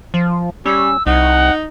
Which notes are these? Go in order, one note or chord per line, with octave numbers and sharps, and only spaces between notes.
F3
G3 C#4 E6
C2 D#4 F#5